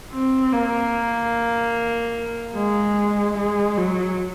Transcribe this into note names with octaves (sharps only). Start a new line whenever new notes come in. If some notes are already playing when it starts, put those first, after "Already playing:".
C4
A#3
G#3
G#3
F#3